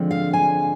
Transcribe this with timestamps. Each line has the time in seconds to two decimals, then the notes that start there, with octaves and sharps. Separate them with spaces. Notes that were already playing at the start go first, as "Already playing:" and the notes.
Already playing: D3 F3 G#3 C4
0.11 F5
0.33 G#5